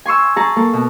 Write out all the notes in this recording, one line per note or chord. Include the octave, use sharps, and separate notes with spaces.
G#5 C6 C#6 E6
G#4 A5 A#5 C#6
A#3 A4
B2